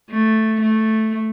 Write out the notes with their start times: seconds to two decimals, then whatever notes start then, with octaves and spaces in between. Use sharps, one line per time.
0.11 A3
0.62 A3